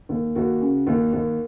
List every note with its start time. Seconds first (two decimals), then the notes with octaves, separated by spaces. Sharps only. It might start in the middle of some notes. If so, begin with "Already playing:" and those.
0.09 D#2
0.35 D#2 F#4
0.61 C#3
0.87 D#2
1.13 D#2